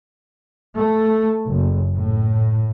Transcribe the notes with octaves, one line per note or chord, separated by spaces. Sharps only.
A3
F#1
A2